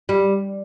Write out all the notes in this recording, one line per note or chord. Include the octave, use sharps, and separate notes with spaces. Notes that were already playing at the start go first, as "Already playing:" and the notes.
G3